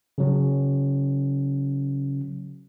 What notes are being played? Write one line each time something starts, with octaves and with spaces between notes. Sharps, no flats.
C#3 F#3 C#4